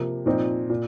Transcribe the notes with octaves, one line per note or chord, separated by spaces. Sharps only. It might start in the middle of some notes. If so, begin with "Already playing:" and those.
Already playing: C3 F3 A#3
A#2 F3 C4 D#4
A#2